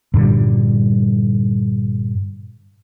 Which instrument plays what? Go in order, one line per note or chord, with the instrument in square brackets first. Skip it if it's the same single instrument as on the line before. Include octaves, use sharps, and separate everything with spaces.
[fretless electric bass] G2 A#2 D3 G3